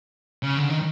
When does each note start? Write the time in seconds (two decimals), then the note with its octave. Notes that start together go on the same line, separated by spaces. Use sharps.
0.43 C#3
0.57 D3
0.70 D#3